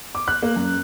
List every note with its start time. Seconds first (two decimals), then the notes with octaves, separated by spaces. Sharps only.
0.15 D6
0.28 F#6
0.42 A#3
0.56 F#2